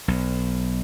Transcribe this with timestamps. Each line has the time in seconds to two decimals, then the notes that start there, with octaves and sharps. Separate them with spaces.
0.08 B1